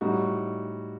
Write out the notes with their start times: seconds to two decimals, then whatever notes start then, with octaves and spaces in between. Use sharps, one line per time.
0.01 A2 G3 D#4 F#4